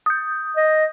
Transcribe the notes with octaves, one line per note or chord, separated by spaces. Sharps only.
D#6 G6
D#5